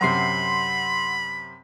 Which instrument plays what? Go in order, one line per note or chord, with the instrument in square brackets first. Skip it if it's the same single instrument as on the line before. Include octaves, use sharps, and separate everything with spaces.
[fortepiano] F#2 C3 [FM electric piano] F#5 C6 C7 [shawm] B5